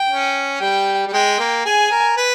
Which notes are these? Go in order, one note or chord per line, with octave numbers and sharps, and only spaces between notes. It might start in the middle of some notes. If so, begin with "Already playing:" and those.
Already playing: G5
C#4
G3 G5
G3
G#3 G5
A#3
G#4 G#5
A#4
B4